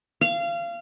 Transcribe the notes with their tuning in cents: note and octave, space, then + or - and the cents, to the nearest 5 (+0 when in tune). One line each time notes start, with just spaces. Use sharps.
F5 -25